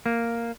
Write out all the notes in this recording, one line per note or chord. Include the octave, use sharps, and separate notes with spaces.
A#3